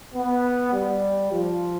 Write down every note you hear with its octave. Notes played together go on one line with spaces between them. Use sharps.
B3
G3
F3